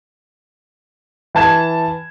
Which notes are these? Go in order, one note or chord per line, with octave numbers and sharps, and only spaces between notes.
E3 A5 G#6 E7